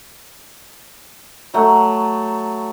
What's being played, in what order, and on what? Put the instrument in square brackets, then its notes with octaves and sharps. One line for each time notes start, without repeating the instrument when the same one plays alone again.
[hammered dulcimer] F#3 A3